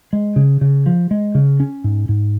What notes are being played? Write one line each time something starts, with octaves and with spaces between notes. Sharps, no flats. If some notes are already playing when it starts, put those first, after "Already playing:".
G#3
C#3
C#3
F3
G#3
C#3
C#4
G#2
G#2